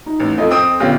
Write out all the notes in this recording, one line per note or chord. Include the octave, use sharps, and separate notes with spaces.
D#4
A1
F2 A4 D#5
C4 D#6 D7
A#1 D3 B3 C#4 G4 F5